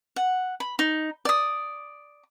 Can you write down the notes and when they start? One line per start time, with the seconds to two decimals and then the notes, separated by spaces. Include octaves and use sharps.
0.16 F#5
0.60 B5
0.79 D#4
1.25 D5 D#6